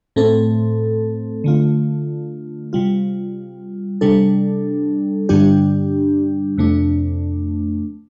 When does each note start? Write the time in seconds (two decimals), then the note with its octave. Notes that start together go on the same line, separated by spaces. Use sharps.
0.16 A2 A3 C4 A4
1.44 D3 A3 F4
2.73 C3 G3 F4
4.01 C3 G3 D4 A4
5.29 G2 D3 G3 D4 G4
6.58 F2 C3 A3 D4